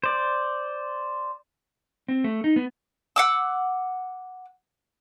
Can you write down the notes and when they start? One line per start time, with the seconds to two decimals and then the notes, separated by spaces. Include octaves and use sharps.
0.04 C5 D5
2.08 C4
2.24 A3
2.44 D#4
2.56 B3
3.16 F#5 D6 E6